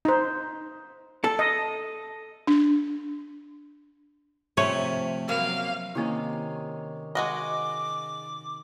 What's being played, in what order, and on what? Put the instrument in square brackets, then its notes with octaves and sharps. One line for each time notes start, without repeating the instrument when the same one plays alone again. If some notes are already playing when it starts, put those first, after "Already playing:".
[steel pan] D#4 C5
[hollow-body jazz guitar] A4
[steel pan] D#5
[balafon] D4
[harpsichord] C3 [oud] F3 A3 C#4 [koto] C#5
[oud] F#3 A#3 B3 [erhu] F5
[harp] C3 D#3 C#4 [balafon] A#3 E4
[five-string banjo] G#3 F#4 D#5 [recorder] D6